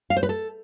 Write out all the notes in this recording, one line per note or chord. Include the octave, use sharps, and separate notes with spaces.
F5
C5
B4
A4